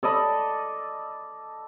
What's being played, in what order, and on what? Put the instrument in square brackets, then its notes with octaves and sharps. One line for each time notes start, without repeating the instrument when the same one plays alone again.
[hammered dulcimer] A4 D5 D#5 B5